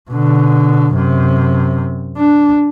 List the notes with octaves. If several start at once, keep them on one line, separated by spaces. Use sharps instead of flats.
B2 D3
F#2 C3
D4